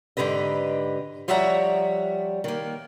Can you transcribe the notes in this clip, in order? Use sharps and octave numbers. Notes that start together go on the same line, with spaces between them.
G#2 D3 G4 B4 D#5
F3 G3 C#5 E5 F#5 A#5
D#3 A#3